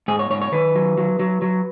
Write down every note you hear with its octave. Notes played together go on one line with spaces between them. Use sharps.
G#2 G#4
C#5
G#2 C#5
C#5
D#3 B4
F#3
F#3
F#3
F#3